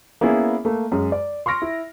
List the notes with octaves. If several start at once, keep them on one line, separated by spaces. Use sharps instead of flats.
A#3 B3 C#4 E4 G#4
A3 A#3
F#2 G#3
D5
C6 C#6 F6 A#6 D7
E4